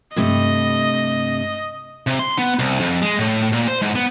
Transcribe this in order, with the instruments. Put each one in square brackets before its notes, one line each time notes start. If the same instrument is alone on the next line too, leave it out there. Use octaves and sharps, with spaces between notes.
[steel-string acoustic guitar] G2 C3 A3 [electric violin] D#5
[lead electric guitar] C3
C6
B3
C2
F2
G#3
A2
A#2
C5
G#2
B3